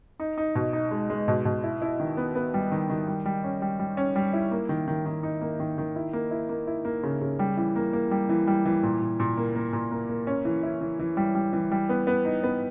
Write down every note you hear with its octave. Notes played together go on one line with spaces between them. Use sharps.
D#4
D#4
B2
D#4
G#3
G#3
B2
B2
E4
E4
D#3
B3
B3
G3
D#3
D#3
G3
G3
C#4
G3
G3
C#4
G3
E4
A#3
D#3
D#3
D#3
D#4
A#3
D#3
D#3
E4
A#3
E4
A#3
E4
A#3
C#3
C#3
G3
E3
A#3
A#3
G3
E3
G3
E3
A#2
A#2
A#2
A#3
A#3
A#2
A#3
A#3
C#4
E3
E4
E3
E3
G3
G3
E3
G3
B3
B3
D#4
B3